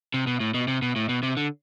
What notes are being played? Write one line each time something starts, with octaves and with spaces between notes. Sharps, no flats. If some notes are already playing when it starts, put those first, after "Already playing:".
C3
B2
A2
B2
C3
B2
A2
B2
C3
D3